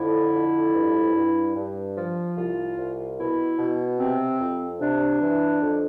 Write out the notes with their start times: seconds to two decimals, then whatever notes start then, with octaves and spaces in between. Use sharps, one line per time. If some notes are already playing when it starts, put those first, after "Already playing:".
Already playing: F2 D3 E4
0.34 F2
0.75 G2
1.15 G2
1.56 G2
1.96 F3
2.37 C2 F4
2.78 C2
3.18 B2 E4
3.59 B2
3.99 C3 C4
4.40 F2
4.81 C3 D4
5.21 E3
5.62 F2